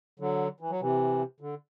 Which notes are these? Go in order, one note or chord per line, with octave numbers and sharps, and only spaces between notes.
D3 F#3
E3
F#3
C3 E3
D3